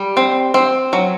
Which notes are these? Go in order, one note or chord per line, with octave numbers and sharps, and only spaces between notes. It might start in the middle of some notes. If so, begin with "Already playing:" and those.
Already playing: G3
C4
C4
F#3